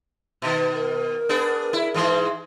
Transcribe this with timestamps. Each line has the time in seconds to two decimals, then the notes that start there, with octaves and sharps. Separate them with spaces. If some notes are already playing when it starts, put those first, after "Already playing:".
0.42 B2 D#3
0.75 A#4
1.29 B3 D4 G#4
1.73 E4
1.94 G#2 E3 G#3